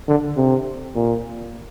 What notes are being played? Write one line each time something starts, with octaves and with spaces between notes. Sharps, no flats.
D3
C3
A#2